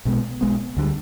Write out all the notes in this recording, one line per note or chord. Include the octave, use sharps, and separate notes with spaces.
B1 B2 G#3 B3
B1 B2 G#3 B3
D2 D3 G3